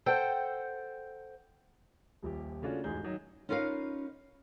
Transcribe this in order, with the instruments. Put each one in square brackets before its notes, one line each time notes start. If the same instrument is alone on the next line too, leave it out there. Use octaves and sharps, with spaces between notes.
[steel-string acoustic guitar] A4 C5 F#5 G5
[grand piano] D#1 A#1 G4
C#3 A3 C#4 D4 F4 F#4
E1 A1 G#2 D#4 G#4 G6
D#3 F#3 D#4
[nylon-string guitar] C#4 D#4 F4 A#4 B4 F5